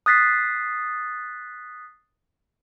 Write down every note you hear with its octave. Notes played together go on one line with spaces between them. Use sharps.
D#6 F#6 A6 B6 C7